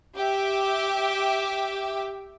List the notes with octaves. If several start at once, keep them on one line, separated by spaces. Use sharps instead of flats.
G4 E5